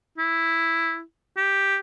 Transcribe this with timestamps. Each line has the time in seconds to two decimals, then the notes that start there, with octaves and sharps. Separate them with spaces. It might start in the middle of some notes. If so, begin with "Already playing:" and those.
0.18 E4
1.37 G4